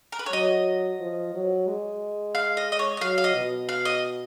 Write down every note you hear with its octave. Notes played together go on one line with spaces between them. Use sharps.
A#4
B4
C#5
F#3 D#5
F3
F#3
G#3
F5
D#5
D#5
C#5
D#5
F#3 F5
F5
D#5
B2
F5
D#5